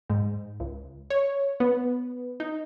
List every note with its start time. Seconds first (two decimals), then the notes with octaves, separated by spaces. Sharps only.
0.10 G#2
0.60 C#2
1.10 C#5
1.60 B3
2.40 D#4